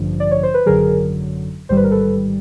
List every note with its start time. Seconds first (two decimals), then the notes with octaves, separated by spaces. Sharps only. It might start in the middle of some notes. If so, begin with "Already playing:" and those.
Already playing: A1 G2 D3 F3
0.20 D5
0.31 C#5
0.43 C5
0.54 B4
0.66 G#1 F#2 D3 F#3 G#4 A#4
1.69 A1 G#2 D#3 G3 C5
1.77 B4
1.84 A#4
1.91 A4 B4